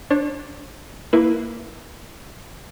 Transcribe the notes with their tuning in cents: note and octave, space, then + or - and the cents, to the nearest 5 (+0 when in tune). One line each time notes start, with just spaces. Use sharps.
D4 +0 C#5 -45
A#3 +0 E4 +0 B4 +0